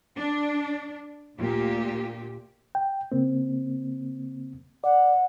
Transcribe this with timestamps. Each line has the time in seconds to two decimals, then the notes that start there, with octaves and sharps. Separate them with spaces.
0.16 D4
1.36 D2 A#2 G4
2.75 G5
3.12 C#3 A#3 C4
4.84 D5 F#5